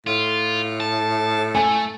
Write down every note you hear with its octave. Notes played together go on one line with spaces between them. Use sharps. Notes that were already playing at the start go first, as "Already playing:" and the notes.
A2 F4
A5
A3 G#5